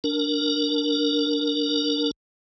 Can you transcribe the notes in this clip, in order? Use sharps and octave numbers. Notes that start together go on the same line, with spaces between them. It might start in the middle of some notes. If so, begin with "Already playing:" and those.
D4 A#4